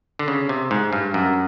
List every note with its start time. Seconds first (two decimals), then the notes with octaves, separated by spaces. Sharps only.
0.19 D3
0.28 C#3
0.49 C3
0.71 G#2
0.93 G2
1.14 F#2